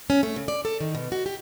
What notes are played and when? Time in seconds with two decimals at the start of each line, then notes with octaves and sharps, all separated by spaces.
0.10 C#4
0.23 A3
0.36 C#3
0.48 D5
0.65 A4
0.81 D#3
0.95 B2
1.12 F#4
1.26 G4